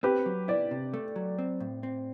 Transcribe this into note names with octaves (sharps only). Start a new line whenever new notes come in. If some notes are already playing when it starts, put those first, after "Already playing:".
C4 G4 B4
F#3
E4 B4 D5
C3
A3
F#3
C4
A2
C4